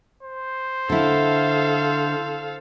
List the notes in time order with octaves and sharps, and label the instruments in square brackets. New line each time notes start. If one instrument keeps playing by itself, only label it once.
[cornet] C5
[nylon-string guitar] D3 E4 [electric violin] A4 F5